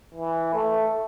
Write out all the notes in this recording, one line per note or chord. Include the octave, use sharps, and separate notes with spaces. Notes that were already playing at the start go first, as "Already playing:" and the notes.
E3
A3